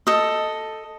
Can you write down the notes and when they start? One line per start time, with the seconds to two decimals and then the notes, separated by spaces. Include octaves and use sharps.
0.07 A4 D#5